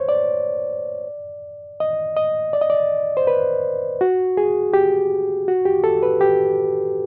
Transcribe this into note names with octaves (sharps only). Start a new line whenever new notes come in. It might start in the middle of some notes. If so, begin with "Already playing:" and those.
Already playing: C5 C#5
D5
D#5
D#5
D5
D#5
D5
C5
B4
F#4
G#4
G4
F#4
G4
A4
B4
G4